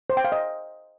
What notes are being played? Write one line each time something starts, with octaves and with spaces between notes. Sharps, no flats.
C5
G5
F5
D#5